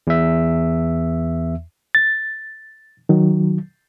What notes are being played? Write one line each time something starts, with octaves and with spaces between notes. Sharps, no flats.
E2 E5
A6
D#3 F#3